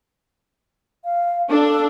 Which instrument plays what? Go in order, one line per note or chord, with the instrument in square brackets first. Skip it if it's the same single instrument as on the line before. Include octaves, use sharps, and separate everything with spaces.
[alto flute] F5
[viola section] D4 [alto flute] A4